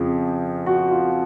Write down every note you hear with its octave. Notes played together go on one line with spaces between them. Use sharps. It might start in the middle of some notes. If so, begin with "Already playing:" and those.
Already playing: F2 C#3 F3 G#4
F#4
F4